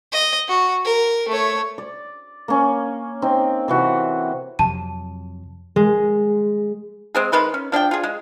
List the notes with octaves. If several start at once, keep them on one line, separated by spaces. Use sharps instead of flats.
D#5
F#4
A#4
A3 C#5
D5
A#3 C#4
C4 D#4
C3 E3 F#4
F2 C3 F#3 A5 D#7
G#3
G#3 C4 G#4
D#3 G#3 B4 C6
C#4
F3 D4 G#4 G5
F4 G#4
G#3